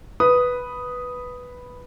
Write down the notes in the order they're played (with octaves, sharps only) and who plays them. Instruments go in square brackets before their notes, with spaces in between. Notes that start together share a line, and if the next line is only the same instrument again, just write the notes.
[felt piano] B4 [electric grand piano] D#6